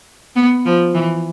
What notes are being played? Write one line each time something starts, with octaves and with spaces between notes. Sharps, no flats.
B3
F3
E3